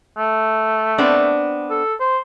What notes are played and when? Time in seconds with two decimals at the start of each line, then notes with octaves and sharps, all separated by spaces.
0.17 A3
0.98 B3 C4 D4
1.70 A4
2.00 C5